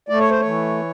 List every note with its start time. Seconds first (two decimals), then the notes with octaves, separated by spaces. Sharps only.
0.09 A3 D5
0.20 C#5
0.30 C5
0.39 C#5
0.46 E3